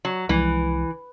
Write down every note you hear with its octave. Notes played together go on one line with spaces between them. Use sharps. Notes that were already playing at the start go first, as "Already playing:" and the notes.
F#3
C2 E3 F3 G#3